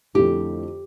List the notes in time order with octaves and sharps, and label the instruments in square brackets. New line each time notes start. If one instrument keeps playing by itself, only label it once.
[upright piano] F2 D3 A3 E4 [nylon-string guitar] G4